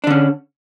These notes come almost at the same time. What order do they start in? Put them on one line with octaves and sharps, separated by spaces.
D4 D3 C#4